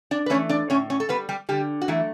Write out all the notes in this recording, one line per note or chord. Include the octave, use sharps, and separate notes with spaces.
D4 D5
B4
E3 A3 C#4 C#5
D4 D5
A2 C#4 C#5
C#4 C#5
A4
G3 B3 B4
G3 G4
D3 G3 G4
F#4
E3 F#3 A3 E4